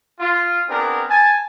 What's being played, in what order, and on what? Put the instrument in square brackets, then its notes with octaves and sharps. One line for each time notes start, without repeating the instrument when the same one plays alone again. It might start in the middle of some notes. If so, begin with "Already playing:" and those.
[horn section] F4
B3 C4 D4 G#4 A#4
G#5 A5